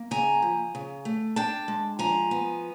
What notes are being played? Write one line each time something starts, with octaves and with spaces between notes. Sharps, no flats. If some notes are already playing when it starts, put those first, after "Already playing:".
Already playing: A#3
C#3 G#5 A#5
F3
C#3
A3
D4 G5 A5
G#3
F3 G#5 A#5
B3